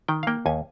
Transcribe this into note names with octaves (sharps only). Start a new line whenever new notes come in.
D#3 G5
F5
A#3 G5
D#2 G#5